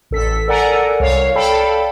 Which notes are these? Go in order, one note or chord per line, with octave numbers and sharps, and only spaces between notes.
A1 A4 B6
A4 A#4 D5 F#5 G#5 A#5
C2 C#5 F5
A4 D5 F5 G5 A5 B5